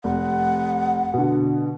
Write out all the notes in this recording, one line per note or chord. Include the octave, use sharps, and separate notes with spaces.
F1 F#5
B2 D3